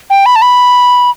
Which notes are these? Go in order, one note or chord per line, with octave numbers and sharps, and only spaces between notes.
G5
B5
A5
B5